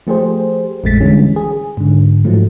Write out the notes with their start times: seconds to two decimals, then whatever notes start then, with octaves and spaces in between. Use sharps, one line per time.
0.07 F3 A3 G4 G#4 C5
0.84 A1 F2 G#3 A3 A6 B6
1.00 D3 E3 G3 G#3 C#4
1.36 G#4
1.77 G#2 D3
2.25 G#2 F3 F#3 A3